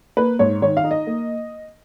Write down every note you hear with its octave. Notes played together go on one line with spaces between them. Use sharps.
A#3 B4
G#2 C#5
D#3 C#5
F5
D#4
D#5
A#3